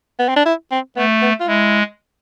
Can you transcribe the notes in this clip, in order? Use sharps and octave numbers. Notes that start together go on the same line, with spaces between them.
B3
C4
D4
E4
C4
A3 B3
B3
F4
G#3 E4